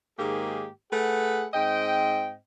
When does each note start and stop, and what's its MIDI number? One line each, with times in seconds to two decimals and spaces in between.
0.19 0.68 44
0.19 0.68 51
0.19 0.68 58
0.19 0.68 67
0.19 0.68 68
0.92 1.46 57
0.92 1.46 68
0.92 1.46 71
0.92 1.46 78
1.54 2.35 44
1.54 2.35 60
1.54 2.35 75
1.54 2.35 79